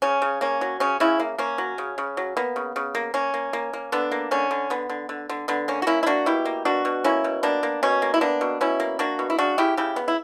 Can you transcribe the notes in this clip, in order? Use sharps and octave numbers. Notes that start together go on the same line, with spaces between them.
C#3 C#4
C#3
A#3 C#4
F#3
C#3 C#4
C#3 C#4 E4
A#3
A#3 C#4
F#3
C#3
C#3
F#3
A#3 B3
C#3
C#3
A#3
A#3 C#4
A#3
A#3
A#3
D3 B3 D4
A#3
D3 C#4
D3
D3 B3
D3
D3
D3
D3 B3
A#3 C#4
F#4
A#3 C#4 E4
E4
A#3 D4 F#4
B2 E4 G4
A#3
B2 D4 F#4
B2
A#3 C#4 E4
B2
A#3 B3 D4
A#3
B2 C#4
A#3
E4
A#3 B3 D4
B2
B2 C#4 E4
A#3
A#3 D4 F#4
B2
E4
C#3 D4 F#4
C#3 E4 G4
C#3 E4 G4
B3
E4